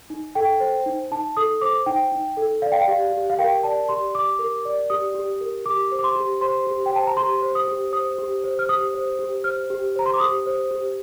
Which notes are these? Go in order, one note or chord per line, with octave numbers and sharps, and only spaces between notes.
D#4
A4 G5
C5
D#4
D#4 A5
A4 D#6
C5 D6
D#4 G5
D#4
A4
D5 F5
G5
F5
G4
G4
F5
A#4 G5
D5 A5
G4 C6
G4 D6
A#4
D5
G4 D#6
G4
A#4
G4 D6
C5
D6
C6
G4
C5 C6
G4
G5
C5 A5
A#5
G4 C6
C5
D#6
G4
C5 D#6
G4
C5
F6
G4 D#6
C5
G4
C5 F6
G4
C5 A#5
C6
D6
G4 D#6
C5
G4